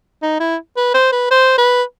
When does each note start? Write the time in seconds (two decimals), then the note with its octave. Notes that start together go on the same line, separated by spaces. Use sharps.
0.22 D#4
0.40 E4
0.77 B4
0.94 C5
1.12 B4
1.31 C5
1.58 B4